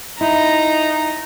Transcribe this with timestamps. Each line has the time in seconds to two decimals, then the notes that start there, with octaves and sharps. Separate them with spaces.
0.21 D#4 E4 A#5